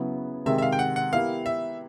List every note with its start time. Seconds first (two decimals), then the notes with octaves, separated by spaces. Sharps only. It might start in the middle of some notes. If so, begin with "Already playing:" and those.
Already playing: C#3 F#3 B3 E4 G#4
0.46 C3 D#3 G#3 E5
0.58 E5
0.62 F5
0.72 G5
0.79 F#5
0.96 F#5
1.12 B3 E4 G4 A#4 F5
1.46 E5